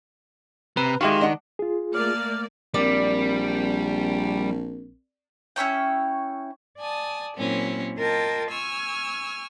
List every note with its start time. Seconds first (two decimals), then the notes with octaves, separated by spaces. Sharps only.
0.77 C3 B4 A#5
1.01 D#3 G#3 F#4 G4 A#4 E5 F5 C6
1.21 D4 D#5 F#5
1.59 F4 G#4
1.94 A3 A#3 D5 F6
2.74 A#1 G3 C4 A#4 D5
5.56 C#4 E4 C#5 G5
6.78 D5 G#5 A5 D#6
7.35 A#2 F#3 A#3 C4 C#4 E4
7.97 F4 A#4 D#5 G5 A5
8.50 G#5 C#6 E6 F6